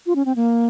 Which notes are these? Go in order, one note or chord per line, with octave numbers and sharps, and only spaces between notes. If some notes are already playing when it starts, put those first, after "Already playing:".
F4
C#4
C4
A#3